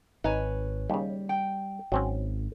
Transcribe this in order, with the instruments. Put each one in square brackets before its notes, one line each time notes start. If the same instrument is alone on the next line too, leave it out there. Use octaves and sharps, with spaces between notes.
[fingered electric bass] G#1 [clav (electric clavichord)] D#4 [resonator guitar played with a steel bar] B4 C#5 G#5
[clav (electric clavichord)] D#2 C#3 [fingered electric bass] G3
[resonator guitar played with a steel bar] G5
[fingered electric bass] G#1 [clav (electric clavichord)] F#3 C4 C#4